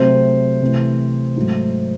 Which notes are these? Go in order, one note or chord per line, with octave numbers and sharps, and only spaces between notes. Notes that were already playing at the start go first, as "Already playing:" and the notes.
Already playing: C3 F#3 A3 C4 C5
C3 E3 A3
G#2 F#3 A3